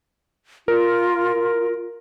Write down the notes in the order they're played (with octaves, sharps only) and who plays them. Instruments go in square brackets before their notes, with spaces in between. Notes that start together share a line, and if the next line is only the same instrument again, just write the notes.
[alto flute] F4 [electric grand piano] A#4